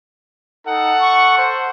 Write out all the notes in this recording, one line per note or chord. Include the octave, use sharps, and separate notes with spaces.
D#4 A4 F#5
C#6
C5